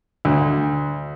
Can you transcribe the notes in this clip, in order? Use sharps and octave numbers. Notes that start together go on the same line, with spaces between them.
D2